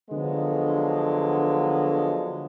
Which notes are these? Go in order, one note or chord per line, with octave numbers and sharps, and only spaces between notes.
D3 F3 F#3 G#3 B3